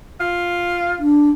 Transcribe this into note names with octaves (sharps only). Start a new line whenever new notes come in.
F4
D4